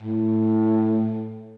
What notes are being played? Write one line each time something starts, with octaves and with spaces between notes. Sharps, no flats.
A2